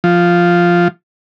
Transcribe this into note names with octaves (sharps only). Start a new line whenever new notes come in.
F3